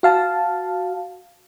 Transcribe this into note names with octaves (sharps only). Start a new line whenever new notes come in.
F#4 F5 A5